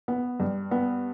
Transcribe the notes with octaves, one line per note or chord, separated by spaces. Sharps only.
B3
G2
B3